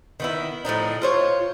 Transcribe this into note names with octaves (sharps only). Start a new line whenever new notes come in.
D#3 B3 E4
A2 F3 D4 D#4
F4 C5 C#5